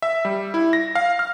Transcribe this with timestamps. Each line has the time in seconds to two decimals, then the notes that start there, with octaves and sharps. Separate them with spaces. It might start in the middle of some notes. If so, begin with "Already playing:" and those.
0.02 E5
0.25 G3
0.54 E4
0.73 A#6
0.95 F5
1.19 F6